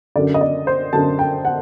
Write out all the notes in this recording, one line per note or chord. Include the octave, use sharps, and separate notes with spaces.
F#2 D3 D5
D#5
D5
C5
F#2 D3 A5
G5
F#5